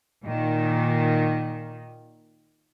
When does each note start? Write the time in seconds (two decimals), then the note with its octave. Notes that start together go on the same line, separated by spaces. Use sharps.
0.24 A#2 D#3